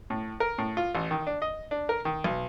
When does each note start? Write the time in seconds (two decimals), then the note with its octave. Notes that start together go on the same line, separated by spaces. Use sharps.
0.10 A2
0.40 A#4
0.58 A2
0.77 F4
0.95 A1
1.11 D#3
1.27 D4
1.42 D#5
1.71 D4
1.89 A#4
2.05 D#3
2.24 B1